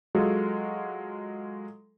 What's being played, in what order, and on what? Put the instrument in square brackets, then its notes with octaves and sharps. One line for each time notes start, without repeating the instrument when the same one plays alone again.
[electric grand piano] F#3 G#3 F4 F#4 G#4 A4